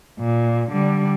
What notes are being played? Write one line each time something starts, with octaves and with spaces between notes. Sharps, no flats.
A#2
D3 G3